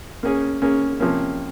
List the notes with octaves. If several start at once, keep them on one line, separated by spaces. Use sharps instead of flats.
A#3 C#4 G#4
A#3 C#4 G#4
C3 F3 A#3 C#4